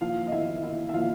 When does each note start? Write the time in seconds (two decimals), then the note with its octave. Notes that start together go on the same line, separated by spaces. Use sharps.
0.01 A#2 F3 F4 F5
0.27 D#5
0.32 E4 E5
0.63 E4 E5
0.89 E5
0.94 A#2 F3 F4 F5